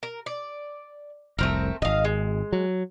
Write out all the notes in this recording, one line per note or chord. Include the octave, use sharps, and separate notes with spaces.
A#4
D5
F1 C2 A3 C4 A#4
D#1 G#1 D#5 F5
G#3
F#3